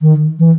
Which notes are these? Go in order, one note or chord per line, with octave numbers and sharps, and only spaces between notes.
D#3
E3